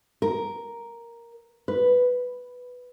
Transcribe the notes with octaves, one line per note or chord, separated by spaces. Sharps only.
A#4
B4